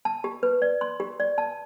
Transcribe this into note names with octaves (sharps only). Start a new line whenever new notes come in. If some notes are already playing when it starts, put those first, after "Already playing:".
A5
G4
B4
D5
C6
G4
D5
A5